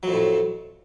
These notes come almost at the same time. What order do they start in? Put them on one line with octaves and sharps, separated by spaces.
F#3 F2 A2